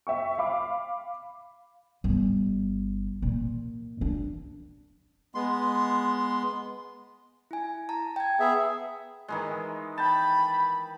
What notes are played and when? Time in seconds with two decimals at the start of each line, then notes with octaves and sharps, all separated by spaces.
0.07 E5 G5 C#6
0.38 F5 B5 D6
2.04 G1
3.22 A#2
4.01 D4
5.35 G#3 B3 C6
7.51 E4 G#5
7.89 A5 A#5
8.16 G5 G#6
8.40 B3 G#4 E5
9.28 D#3 E3 G#3
9.98 G5 A5 B5